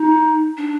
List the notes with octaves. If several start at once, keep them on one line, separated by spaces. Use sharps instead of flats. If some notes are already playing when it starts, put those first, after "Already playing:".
Already playing: D#4
D4